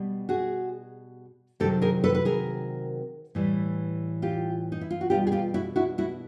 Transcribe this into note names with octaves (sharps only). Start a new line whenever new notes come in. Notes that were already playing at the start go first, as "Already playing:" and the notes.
Already playing: B2 G3
F#4 G#4
C3 D#3 F#3 G4 A4
G#4 A#4
A4 B4
B4
G#4 A#4
A2 E3 G3
F4 G4
D#4
E4
F4
F#4
B2 G3 F4 G4
G#4
F4 G4
E4 F#4
E4 F#4
E4 F#4